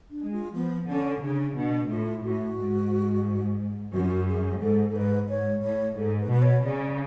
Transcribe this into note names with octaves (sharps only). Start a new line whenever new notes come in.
D4
G#3
F4
F3 B3
D3 C#4
C#3 D4
B2 D4
A2 F4
A2 F#4
G#2
F#2 F#4
F4
F#4
G#4
G#2 A4
A4
G#2 B4
G#2 C#5
A2 C#5
G#2 A4
B4
B2 B4
C#5
C#3 D5